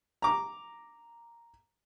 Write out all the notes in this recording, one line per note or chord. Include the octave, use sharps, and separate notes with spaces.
A#5 D6